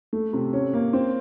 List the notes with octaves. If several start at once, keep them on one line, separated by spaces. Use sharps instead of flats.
A3
C3
C#4
A#3
C4